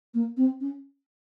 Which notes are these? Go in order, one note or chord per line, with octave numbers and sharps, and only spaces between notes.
A#3
C4
C#4